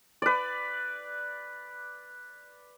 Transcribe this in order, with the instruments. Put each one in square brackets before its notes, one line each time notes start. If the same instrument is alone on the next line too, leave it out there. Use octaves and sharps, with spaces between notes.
[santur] B4 D5